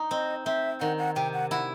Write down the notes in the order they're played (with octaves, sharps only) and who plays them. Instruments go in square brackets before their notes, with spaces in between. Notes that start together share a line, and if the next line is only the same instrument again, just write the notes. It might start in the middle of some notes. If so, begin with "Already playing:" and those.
Already playing: [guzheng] D#4
[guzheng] C4 [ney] D#5
[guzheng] C4 [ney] E5
[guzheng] D#3 [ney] F#5
[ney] F#5
[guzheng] C3 [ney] G5
[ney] F#5
[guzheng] E4 [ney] F#5